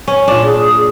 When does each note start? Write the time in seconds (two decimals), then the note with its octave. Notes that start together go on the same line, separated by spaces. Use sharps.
0.08 C#4
0.28 A#2 D4
0.44 G#4